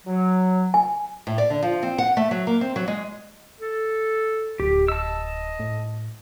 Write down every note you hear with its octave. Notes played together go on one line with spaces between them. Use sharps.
F#3
G#5
A2
D5
D3
F3
C4
F#5
A3
F#3
A#3
C4
F#3
G#3
A4
D1 G4
D#5 A5 E6
A2